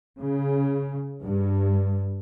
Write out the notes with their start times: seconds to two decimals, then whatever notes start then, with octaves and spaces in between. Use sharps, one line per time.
0.22 C#3
1.24 G2